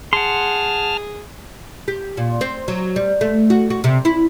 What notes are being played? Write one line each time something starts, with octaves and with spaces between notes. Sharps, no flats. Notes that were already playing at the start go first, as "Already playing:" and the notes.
G#4 F#5 A5 C6 F6
G4
A#2
C4
F#3
G3
A3
F#4
F#4
C3
E4